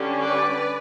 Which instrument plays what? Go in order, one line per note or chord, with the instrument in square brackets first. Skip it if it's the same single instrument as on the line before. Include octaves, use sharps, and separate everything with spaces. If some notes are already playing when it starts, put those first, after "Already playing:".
Already playing: [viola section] D3 G3 C#4
B4 D5